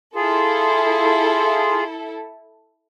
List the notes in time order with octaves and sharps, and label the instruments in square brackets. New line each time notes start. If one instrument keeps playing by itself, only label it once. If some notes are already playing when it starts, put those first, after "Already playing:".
[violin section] E4 A4 [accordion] F4 G#4